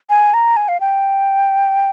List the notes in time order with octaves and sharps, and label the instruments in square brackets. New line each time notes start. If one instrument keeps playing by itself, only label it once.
[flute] G#5
A#5
G#5
F5
G5